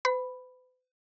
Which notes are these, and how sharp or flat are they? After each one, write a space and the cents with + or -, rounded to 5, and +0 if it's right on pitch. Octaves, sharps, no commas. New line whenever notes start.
B4 +45 B5 +0